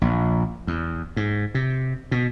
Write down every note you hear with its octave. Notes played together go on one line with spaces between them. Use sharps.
A#1
E2
G#2
C3
B2